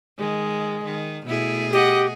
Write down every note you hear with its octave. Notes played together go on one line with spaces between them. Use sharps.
D#3 G#3
D#3
B2 A3 E4 G#4
G4 D#5 F#5